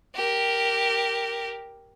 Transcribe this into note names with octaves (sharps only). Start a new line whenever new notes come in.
G4 A#4